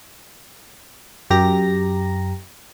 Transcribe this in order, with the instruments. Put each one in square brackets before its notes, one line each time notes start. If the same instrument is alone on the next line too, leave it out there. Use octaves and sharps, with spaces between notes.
[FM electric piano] F#2 G4 A#5 A#6